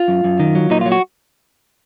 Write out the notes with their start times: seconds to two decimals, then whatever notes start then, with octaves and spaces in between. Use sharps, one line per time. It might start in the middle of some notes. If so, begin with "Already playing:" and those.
Already playing: F4
0.08 F#2
0.24 F#2
0.40 D#3
0.55 F#3
0.70 A#2 D#4
0.81 F#3 F4
0.92 F#4